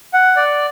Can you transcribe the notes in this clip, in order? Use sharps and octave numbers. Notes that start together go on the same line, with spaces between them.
F#5
D5